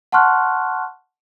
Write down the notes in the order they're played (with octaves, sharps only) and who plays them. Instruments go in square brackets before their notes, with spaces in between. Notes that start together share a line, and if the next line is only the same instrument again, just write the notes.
[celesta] F#5 A5 C6 C#6 F6 F#6